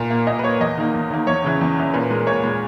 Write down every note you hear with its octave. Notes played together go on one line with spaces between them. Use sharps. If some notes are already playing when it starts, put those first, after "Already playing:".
Already playing: A#2 A#4
A#3
A#2 D#5
B4
A#3 C#5
E2 D#5
D#3 A#3
E2
D#3 A#3
E2 C#5
C#3 E3
E2
C#3 E3
A#2 B4
G#3 A#4
A#2 C#5
G#3